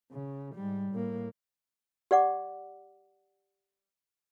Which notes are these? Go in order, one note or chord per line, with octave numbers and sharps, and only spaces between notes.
C#3
G#2 G3
A2 A#3
G4 D5 F#5 D6